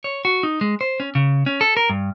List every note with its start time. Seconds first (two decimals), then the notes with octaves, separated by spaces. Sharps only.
0.04 C#5
0.25 F#4
0.43 D#4
0.61 G#3
0.81 C5
1.00 C#4
1.15 C#3
1.46 C#4
1.61 A4
1.77 A#4
1.90 G2